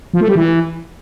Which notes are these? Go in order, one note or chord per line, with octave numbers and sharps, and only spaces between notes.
F3
A3
G3
E3